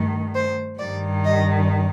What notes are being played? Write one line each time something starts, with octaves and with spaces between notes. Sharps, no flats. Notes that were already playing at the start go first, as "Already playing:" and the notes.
Already playing: G2 D#3 A3
C5
G2 D#3 G3 D5
D#5